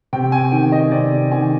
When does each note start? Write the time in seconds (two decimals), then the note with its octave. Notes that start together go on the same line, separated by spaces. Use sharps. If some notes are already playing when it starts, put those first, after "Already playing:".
0.13 C3 G5
0.32 G#5
0.52 D#3 G5
0.72 D#5
0.92 C3 D5
1.31 D#3 G#5